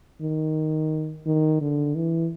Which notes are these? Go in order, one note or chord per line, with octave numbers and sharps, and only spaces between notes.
D#3
D#3
D3
E3